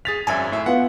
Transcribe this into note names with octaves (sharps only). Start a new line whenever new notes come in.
G#4 A6 B6 F7
G#1 F#2 E5 G#5
A2 E5
B3 F4 F#5